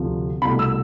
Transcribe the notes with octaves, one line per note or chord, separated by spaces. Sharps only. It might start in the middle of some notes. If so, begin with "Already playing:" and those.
Already playing: D2 C3 F3
C2 B2 A3 B5
E6